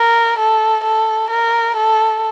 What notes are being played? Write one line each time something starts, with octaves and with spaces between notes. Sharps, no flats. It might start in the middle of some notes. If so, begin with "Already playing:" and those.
Already playing: A#4
A4
A4
A#4
A4